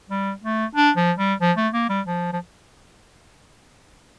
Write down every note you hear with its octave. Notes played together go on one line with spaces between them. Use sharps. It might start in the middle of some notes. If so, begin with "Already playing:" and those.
G3
A3
D4
F3
G3
F3
A3
A#3
G3
F3
F3